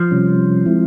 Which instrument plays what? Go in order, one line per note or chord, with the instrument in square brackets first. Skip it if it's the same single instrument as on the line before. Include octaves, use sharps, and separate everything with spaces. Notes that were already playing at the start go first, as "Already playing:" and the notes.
Already playing: [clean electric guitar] F3
[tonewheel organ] C3 G3 C#4
G#3 C4 E4